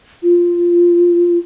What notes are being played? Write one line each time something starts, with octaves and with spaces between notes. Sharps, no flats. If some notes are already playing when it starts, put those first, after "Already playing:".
F4